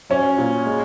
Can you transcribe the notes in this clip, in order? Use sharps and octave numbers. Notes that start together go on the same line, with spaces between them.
F#3 C#4
A#2
G#3